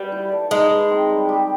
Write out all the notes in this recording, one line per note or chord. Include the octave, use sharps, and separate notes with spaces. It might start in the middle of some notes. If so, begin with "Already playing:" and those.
Already playing: G3 C#4 F#4 B4
E4
A4
G#3 D#4
B4
C4
G3
G4